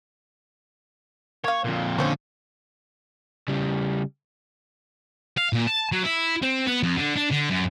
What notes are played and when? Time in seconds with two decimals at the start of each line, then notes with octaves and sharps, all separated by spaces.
1.44 A#3 C#5 F5
1.64 F2 A#2
1.98 D3 C#4 C5 C#5
3.48 C#3 G3
5.37 F5
5.53 A#2
5.67 A5
5.92 F#3
6.03 E4
6.42 C4
6.66 B3
6.83 F2
6.97 D3
7.17 D4
7.32 D3
7.50 F#2